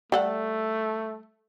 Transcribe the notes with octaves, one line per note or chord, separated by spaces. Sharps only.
G3 A3 A4 F#5